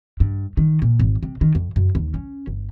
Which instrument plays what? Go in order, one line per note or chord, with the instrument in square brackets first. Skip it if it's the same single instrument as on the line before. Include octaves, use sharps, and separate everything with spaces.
[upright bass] G2
D#3
A#2
G#1
C3
D#3
F2
F#2
D#2
C#4
G1